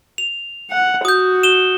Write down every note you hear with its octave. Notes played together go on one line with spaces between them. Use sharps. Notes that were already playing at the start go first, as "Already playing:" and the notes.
F7
F#5
F#4 D#6 G6
E7 G7